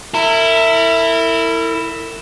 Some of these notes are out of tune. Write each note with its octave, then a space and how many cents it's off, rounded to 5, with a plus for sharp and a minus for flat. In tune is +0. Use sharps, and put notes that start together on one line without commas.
E4 +0 A#4 -40